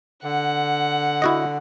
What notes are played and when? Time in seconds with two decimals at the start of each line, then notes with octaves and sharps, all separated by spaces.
0.24 D3 F#5
1.22 E4 F#4 D#5